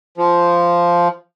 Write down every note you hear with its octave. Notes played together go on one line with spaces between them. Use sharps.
F3